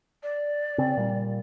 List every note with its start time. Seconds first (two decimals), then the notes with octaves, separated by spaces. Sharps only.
0.23 D5
0.78 C#3 C4
0.97 A#2 G3